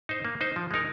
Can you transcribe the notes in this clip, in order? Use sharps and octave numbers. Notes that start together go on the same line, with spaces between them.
D#4 C5
A#3
D#4 C5
F3
G#3 D#4 A#4